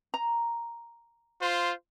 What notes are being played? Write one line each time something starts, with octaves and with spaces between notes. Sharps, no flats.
A#5
F4 C5